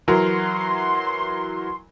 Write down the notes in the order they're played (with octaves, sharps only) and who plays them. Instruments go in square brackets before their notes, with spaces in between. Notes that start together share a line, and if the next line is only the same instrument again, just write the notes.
[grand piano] E3 F#3 A#4 [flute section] C6